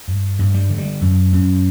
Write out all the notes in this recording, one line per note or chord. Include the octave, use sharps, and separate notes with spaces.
G2
G2
G3
D3
G3
F#2
F#2